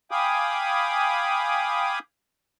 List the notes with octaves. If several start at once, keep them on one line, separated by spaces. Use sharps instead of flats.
F5 G5 G#5 B5 D6 D#6